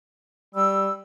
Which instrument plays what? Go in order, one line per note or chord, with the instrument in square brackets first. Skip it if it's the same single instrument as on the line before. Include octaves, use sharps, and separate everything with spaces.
[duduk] G3 [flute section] E6